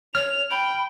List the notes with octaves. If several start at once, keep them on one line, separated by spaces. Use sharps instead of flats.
C#5 F6 F7
G5 B5